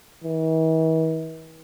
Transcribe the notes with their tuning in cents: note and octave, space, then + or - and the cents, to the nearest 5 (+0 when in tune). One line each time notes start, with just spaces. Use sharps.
E3 -45